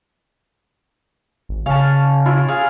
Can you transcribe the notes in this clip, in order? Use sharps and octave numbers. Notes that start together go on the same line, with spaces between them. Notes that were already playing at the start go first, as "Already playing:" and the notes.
G#1
C#3 C#4 F5 A5
E4 F4
G#4 F5